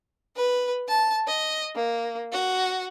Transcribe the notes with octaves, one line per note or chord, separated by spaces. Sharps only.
B4
A5
D#5
A#3
F#4